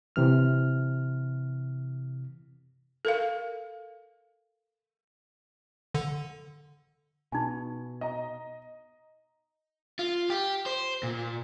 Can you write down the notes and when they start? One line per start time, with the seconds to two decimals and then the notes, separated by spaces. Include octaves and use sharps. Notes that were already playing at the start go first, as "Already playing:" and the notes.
0.16 C3 E3 F6
3.05 A4 A#4 F5
5.95 D3
7.32 B2 D#4 G#5
8.01 D#5 A#5
9.99 F4
10.30 G4
10.66 C5
11.03 A#2